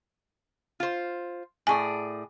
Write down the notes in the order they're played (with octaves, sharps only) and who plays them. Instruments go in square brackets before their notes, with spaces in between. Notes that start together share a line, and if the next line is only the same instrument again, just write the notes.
[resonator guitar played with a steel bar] F4 C5
[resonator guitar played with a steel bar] A2 G#4 D5 [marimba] G#5 C#6